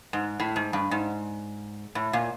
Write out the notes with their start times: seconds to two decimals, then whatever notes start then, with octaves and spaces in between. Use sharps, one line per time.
0.13 G#2
0.40 A2
0.56 G#2
0.73 G2
0.91 G#2
1.95 A2
2.13 A#2